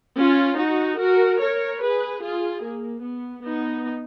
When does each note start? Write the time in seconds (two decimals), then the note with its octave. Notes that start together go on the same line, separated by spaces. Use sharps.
0.18 C#4 F4
0.58 D#4 F#4
1.00 F#4 A#4
1.41 A#4 C#5
1.82 G#4 B4
2.22 F4 G#4
2.64 A#3
3.05 B3
3.46 B3 D#4